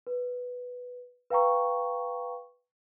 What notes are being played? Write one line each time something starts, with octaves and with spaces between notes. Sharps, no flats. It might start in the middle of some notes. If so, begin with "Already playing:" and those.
B4
B4 F5 G5 A#5 C#6